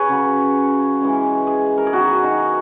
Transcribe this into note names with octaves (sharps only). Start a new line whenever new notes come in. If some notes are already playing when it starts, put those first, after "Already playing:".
Already playing: G#4 B4 C#5
C#3 F#3 C#4
E3 G#3 C#4
G#4
A#4
G#4
D#3 F#3 B3 F#4
D#4